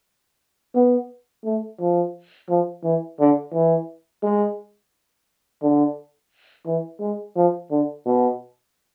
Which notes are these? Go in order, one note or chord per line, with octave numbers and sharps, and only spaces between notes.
B3
A3
F3
F3
E3
D3
E3
G#3
D3
E3
G#3
F3
D3
B2